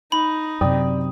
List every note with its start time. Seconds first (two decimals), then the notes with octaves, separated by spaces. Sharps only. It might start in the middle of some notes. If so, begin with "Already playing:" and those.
0.12 D#4 B5
0.61 F#2 C3 D5 G5 D#6